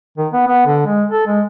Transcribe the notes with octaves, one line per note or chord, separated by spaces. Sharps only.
D#3
B3
B3
D3
G#3
A4
G#3